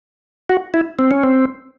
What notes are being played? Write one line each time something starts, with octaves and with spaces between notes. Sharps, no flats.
F#4
E4
C4
C#4
C4